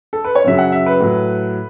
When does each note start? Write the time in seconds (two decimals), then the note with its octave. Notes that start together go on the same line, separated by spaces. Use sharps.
0.13 A4
0.24 B4
0.35 C#5
0.44 F#2 C#3 F#3 E5
0.58 F#5
0.72 E5
0.86 B4
1.00 A2 F#3